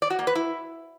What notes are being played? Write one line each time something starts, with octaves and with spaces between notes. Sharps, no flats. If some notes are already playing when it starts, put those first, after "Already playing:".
D5
F#4
A#3
B4
E4